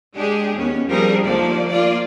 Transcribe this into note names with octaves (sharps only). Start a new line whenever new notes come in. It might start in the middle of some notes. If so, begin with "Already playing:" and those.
G#3 D4 G4 G#4
D#2 B3 C#4
F3 G3 C4 D4 G#4 A#4
D#2 D3 F3 A3 A#3 D5
A#3 F4 D5